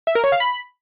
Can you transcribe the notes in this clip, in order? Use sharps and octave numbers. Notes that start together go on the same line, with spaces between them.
E5
A#4
C#5
F5
B5